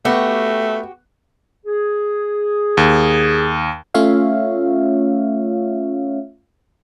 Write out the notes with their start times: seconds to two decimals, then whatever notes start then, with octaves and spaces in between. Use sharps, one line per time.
0.05 A3 B3 F#4 G4
1.66 G#4
2.77 D#2
3.94 A3 C#4 F4 C#5 E5 F5